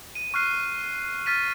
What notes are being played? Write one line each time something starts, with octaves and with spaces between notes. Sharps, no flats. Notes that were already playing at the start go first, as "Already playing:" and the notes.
D#7
C#6 F6 F#6 C7 D#7
F6 A6 B6 D#7